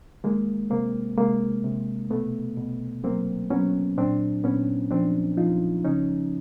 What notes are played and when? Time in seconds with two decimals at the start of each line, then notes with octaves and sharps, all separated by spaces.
0.24 D#3 G#3 A#3
0.70 C3 A#3 C4
1.18 C3 G#3 A#3
1.64 C3
2.10 B2 A3 B3
2.57 B2
3.04 F#3 A#3 C4
3.50 F#3 B3 C#4
3.97 A#2 C4 D4
4.44 A#2 B3 C#4
4.90 F3 C4 D4
5.37 F3 D#4 F4
5.84 C#3 C#4 D#4